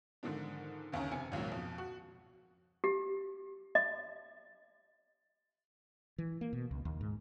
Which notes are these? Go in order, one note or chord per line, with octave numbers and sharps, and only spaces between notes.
G#2 D3 D#3 F3 D4
G1 D#2 C#3 C#4 A#5
F1 C3 G#5 C#7
G#1 C#2 A#2 F#3
F2 B2
F#4
G4
D#5
E3
A#3
B2
C#2
D#2
G#2